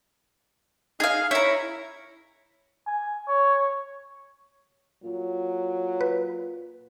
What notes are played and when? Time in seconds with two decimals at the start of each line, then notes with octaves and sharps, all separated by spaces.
1.00 D#4 G#4 F5
1.31 E4 C#5 A#5
2.87 G#5
3.28 C#5
5.03 A#2 F#3
6.01 B4